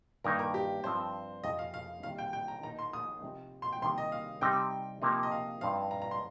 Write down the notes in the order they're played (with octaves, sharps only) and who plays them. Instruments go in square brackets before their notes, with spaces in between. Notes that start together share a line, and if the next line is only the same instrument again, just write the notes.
[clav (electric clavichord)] G2 D#3 A#3 D#4 [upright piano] A#4
[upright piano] A#4
G4
[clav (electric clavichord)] G2 F3 C4 [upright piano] C5
[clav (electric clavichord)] F2 C3 F3 D#4 [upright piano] D#5
[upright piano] F5
F5
[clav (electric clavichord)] C3 D#3 G3 A#3 D#4 [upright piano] F5
[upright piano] G5
G5
A#5
[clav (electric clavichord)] D#3 A#3 D#4 [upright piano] A#5
[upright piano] C6
D#6
[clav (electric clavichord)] C3 F3 D#4
[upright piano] C6
G5
[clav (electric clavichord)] C3 D#3 G3 A#3 D#4 [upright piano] C6
[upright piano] D#5
F5
[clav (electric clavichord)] C3 G3 C4 D#4 [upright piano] G5
[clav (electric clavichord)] C3 F3 A#3 D#4
[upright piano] D#5
F5
[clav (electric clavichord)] G2 F3 C4 D#4 [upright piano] F5
[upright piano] A#5
A#5
C6